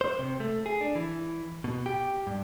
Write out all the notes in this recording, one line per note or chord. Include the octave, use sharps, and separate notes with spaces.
C5
C3
A3
G#4
D4
E3
B2
G4
G2